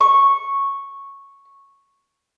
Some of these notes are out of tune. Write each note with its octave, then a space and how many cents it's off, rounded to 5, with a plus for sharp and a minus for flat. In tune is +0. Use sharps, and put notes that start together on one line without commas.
C#6 -5